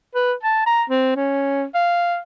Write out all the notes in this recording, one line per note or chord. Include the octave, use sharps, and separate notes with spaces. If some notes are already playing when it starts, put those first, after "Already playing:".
B4
A5
A#5
C4
C#4
F5